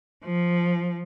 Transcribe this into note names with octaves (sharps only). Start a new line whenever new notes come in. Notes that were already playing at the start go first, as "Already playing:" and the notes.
F3